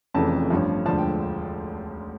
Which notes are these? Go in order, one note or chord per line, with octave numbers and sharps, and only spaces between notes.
F1 F2 C#3 E3 A5
A1 G2 F3
E1 D2 D3 F3 A5
G5